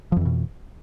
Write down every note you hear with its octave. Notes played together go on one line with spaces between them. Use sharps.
F2 B2 E3 F3